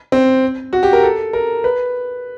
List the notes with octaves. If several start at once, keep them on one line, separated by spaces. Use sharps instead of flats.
C4
F#4
G4
A#4
A4
A#4
B4